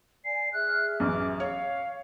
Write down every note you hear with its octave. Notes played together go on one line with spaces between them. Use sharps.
D5 G#5 C7
G#4 E5 F6 F#6
A1 F#2 D6
C#5 F5